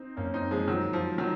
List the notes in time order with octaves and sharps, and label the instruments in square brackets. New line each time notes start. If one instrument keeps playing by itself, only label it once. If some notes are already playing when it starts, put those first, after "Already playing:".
Already playing: [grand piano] C4 D#4
[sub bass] F#2 [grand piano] A#3 C#4
[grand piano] C4 D#4
F3 G#3
D#3 F#3
F3
D#3 F#3